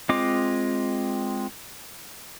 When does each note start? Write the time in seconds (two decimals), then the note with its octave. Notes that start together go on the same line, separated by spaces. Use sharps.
0.09 G#3 C4 F4 D#5 D6